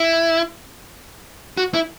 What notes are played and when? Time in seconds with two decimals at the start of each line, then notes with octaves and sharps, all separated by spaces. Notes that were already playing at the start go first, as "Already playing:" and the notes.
Already playing: E4
1.57 F#4
1.74 E4